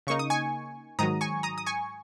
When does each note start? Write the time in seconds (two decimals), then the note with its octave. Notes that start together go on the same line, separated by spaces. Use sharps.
0.07 C#3 A#3 D#4 C#6
0.19 D#6
0.30 G#5 C#6
0.99 G#2 D#3 F#3 A#5 D#6
1.21 G#5 C#6
1.43 A#5 D#6
1.58 D#6
1.66 G#5 C#6